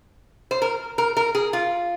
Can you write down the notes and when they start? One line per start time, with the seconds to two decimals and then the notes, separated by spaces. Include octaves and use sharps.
0.51 C5
0.62 A#4
0.98 A#4
1.17 A#4
1.35 G#4
1.53 F4